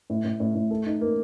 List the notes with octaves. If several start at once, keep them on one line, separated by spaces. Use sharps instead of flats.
A2
A2
A2
A2
A4
D#4
A#3